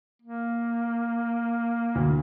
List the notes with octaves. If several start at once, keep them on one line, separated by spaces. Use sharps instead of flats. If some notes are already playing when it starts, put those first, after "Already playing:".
A#3
D2